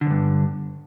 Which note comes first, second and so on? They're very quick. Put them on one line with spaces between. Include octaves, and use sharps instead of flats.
D3 E2 G2